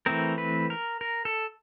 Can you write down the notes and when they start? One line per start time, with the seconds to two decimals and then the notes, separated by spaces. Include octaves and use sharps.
0.06 E3 A3 C4 A#4
0.38 B4
0.70 A#4
1.01 A#4
1.25 A4